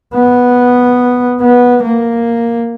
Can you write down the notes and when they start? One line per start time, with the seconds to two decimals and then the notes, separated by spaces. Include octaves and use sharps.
0.14 B3
1.41 B3
1.83 A#3